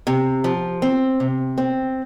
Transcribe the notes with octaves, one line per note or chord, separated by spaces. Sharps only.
C3
F3
C4
C3
C4